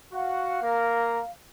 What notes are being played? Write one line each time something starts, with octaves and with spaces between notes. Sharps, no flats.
F#4 F5 F#5
A#3 A#4